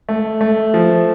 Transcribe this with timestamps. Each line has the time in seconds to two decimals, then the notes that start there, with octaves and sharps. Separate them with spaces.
0.09 A3
0.41 A3
0.74 F3